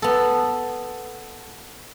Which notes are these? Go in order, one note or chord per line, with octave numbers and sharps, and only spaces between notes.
B3 A4